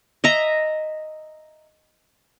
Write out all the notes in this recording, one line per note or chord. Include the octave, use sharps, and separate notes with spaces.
D#5 E5 A#5